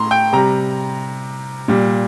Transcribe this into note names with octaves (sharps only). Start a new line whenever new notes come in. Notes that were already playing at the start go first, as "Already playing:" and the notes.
Already playing: A2 A#5 C6
G5
C3 G3 A#5
A#2 G3